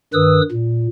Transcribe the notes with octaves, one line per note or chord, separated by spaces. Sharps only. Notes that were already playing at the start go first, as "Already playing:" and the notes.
G2 D#3 B4 D#6 E6
A#2